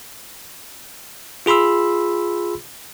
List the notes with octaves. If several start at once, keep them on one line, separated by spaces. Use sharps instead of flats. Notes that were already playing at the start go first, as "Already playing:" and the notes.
F4 G#4 B5 C6 E6